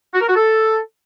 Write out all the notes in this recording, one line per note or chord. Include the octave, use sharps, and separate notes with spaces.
F#4
A#4
F#4
A4